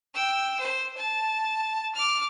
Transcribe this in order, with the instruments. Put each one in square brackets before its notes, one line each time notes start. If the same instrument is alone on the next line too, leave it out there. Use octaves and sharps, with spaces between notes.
[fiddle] G5 E6
C5
A5
D6 F6